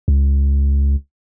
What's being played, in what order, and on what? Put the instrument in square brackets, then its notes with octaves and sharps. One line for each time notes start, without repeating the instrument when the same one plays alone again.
[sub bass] C#2